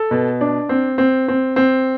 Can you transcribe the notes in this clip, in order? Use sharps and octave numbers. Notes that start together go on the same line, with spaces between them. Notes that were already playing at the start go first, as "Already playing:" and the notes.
Already playing: A4
B2
D4
C4
C4
C4
C4